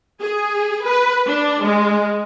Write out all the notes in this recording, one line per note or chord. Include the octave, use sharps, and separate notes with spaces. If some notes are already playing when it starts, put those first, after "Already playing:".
G#4
B4
D4
G#3